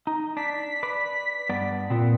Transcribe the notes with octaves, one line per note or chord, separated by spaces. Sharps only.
D#4
D4 B6
B4 D5
G2 B3 D5
A#2 B3 C4